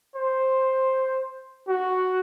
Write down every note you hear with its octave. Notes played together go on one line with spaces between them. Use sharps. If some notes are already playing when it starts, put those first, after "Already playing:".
C5
F#4